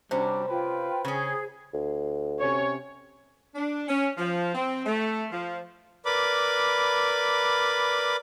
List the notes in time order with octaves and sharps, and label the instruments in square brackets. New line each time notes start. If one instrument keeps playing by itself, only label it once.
[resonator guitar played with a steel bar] C3 C#4 [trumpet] G3 [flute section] D4 F#4 [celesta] C5
[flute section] F4 G5 [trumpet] B4
[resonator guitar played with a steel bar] C#3 C#4 [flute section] G#4
[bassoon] D2
[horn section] C3 C#4 C#5
D4
C#4
F3
C4
A3
F3
[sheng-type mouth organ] A#4 B4 D5 B5 D6